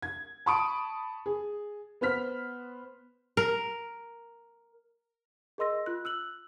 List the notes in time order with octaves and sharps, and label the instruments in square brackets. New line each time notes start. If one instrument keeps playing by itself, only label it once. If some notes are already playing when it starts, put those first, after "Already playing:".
[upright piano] G#6
A5 B5 C#6 D#6 D7
G#4
B3 B4 C5 F6 B6
[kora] A#4
[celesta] G#4 A#4 D#5 C6 E6 A#6
F4 F#6
E6 F#6 F#7